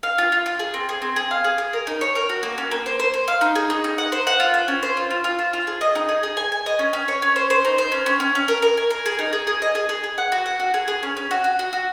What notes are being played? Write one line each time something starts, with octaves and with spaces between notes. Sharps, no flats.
F5
F4
F4
F4
G#4
C4
G#4
C4
G#4
F5
G#4
G#4
A#4
D#4
C#5
A#4
F#4
A#3
C#4
A#3
C5
C5
C5
F5
D#4
G#4
D#4
D#4
F#5
C5
F#5
F4
C5
C#4
C5
F4
F4
F4
C5
F4
G#4
D#5
D#4
G#4
G#4
G#5
G#5
D#5
C#4
C#4
C#5
C#4
C5
C5
D#4
C5
C#4
C#4
C#4
C#4
A#4
A#4
G#5
A#4
G#4
D#4
G#4
G#4
D#5
G#4
G#4
G#4
F#5
F#4
F#5
F#4
G#4
G#4
C#4
C#4
F#4
F#4
F#4
F#4